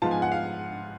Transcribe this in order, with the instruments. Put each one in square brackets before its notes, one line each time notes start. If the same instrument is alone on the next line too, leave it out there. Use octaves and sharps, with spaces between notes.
[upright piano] G#2 F3 B3 F4 A5
G#5
F#5
F5